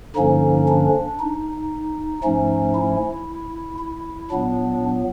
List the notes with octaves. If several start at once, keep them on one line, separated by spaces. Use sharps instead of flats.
G2 D3 F3 A#3 C#4 D#4
D4
D#4
G#2 F3 A3 C#4 D#4
E4
E4
A#2 F#3 B3 D4